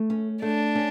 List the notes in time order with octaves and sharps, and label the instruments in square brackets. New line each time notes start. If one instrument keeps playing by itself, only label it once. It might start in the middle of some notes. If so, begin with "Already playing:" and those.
Already playing: [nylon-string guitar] A3
C#4
[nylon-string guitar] A3 [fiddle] D4
[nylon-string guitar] C#4